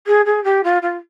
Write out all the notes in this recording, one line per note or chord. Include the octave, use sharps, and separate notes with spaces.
G#4
G#4
G4
F4
F4